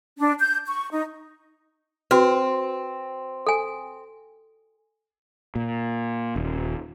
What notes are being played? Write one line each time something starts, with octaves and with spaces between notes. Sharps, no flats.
D4
G6
C#6
D#4
C4 F#4 B4
A4 G#5
A#2
D#1